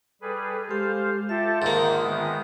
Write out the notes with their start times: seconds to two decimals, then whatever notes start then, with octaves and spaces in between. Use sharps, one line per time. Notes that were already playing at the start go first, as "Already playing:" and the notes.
0.22 G3 G#4 A4 B4
0.69 G#3 G4 A4 C5 F5
1.29 F4 G4 A4 E5 A5
1.62 G#2 D3 D#3 A#3
2.03 D#3 G#3 B3